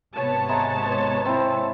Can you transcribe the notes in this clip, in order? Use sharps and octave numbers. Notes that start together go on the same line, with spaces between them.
G#1 C3 B3 C#5 A5
G#3 E5 A#5
C4 E4